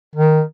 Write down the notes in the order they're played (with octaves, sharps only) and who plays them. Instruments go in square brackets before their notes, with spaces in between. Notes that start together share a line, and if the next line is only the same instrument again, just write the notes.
[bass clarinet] D#3